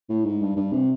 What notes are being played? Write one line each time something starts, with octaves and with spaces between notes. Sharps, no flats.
A2
G#2
G2
G2
C3